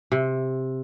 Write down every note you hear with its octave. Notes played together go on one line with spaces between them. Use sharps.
C3